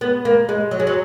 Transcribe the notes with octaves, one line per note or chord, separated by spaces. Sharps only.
B3
A#3
G#3
F#3
G#3
F#3